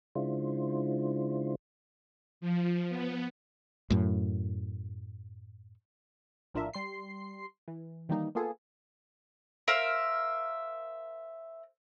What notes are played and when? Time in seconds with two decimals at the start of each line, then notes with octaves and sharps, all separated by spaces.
0.15 C#3 G#3 D4 E4 F4 C5
2.41 F3
2.89 B3
3.90 F#2 A2
6.54 A#1 A2 D4 F4 A#4 E5
6.73 G3 C6 C7
7.68 E3
8.09 D#3 E3 G3 A#3 D#4
8.35 A#3 B3 F4 G#4 A4
9.68 A#4 C5 E5 F5